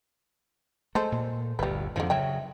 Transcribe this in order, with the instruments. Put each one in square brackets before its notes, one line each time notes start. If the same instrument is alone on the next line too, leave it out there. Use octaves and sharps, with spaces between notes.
[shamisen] G#3 A4 C5 [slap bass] A3
[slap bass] A#2
[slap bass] G1 D2 [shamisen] G3 B4
[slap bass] F2 G#2 D#3 [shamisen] D3 F3
[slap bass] C#3 F#3 [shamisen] C#5 E5 G5